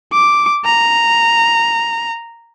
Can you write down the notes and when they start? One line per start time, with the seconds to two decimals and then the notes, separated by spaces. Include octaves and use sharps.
0.13 D6
0.65 A#5